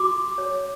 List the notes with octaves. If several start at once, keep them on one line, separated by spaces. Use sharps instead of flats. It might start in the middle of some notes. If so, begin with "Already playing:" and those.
Already playing: F#4 C6 D6
C#5